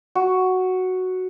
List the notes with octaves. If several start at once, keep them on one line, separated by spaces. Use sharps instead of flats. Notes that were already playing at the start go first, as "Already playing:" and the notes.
F#4